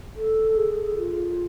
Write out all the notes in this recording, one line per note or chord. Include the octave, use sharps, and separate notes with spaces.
A4
G#4
F4